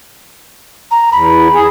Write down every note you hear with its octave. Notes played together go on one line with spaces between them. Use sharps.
A#5
E2 B5
G#4